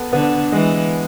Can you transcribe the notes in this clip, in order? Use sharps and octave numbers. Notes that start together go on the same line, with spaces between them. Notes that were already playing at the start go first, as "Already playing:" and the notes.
Already playing: B3 A4
D3 B3
E3 G#3